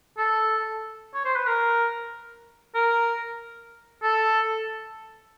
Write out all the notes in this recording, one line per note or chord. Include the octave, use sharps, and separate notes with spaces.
A4
C#5
C5
B4
A#4
A#4
A4